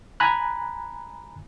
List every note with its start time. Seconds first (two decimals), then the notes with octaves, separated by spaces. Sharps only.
0.20 G#5 A#5 B5 F#6